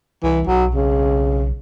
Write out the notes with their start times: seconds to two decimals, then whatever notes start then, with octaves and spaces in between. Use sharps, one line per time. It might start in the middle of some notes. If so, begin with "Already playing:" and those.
0.23 C2 E3
0.47 B1 F#3
0.75 C#3